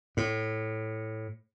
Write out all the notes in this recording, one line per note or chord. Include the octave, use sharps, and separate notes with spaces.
A2